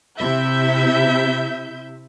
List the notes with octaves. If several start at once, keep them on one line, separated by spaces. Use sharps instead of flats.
C3 E4 E5 G6